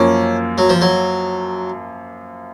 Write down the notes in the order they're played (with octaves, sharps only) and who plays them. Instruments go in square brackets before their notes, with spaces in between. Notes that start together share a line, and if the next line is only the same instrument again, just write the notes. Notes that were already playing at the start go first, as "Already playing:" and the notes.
Already playing: [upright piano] F#2 F3 A#3 [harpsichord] C#4
[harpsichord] F#3
F3
F#3